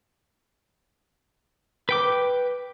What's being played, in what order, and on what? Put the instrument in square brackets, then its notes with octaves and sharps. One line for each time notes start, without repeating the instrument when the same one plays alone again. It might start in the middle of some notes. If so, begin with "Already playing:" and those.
[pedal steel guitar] B4 G5 D6